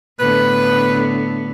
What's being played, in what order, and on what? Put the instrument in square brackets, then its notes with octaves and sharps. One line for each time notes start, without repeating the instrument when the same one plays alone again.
[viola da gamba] A2 D3 B3 [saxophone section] B4